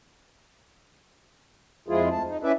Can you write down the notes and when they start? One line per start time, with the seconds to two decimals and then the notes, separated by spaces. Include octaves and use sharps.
1.88 F2 F3 G#3 E4 F4 G#4
2.12 D2 A5
2.27 D#4
2.43 C#4 E4 B4 D5 E5